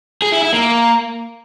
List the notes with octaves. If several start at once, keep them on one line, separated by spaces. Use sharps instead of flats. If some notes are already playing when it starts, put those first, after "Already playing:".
G#4
E4
E4
A#3